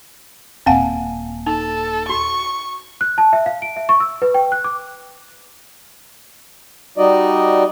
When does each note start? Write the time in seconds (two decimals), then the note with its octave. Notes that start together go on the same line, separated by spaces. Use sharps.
0.66 D#1 A#2 C4 F5 F#5 G#5 A5
1.47 D#4 A4
2.09 F#4 C#6
3.01 F#6
3.18 A5
3.33 E5
3.46 F5
3.62 D7
3.76 E5
3.89 C#6
4.00 E6
4.22 B4
4.34 G5
4.52 F#6
4.64 D6
6.98 G3 D#4 F#4 D5 D#5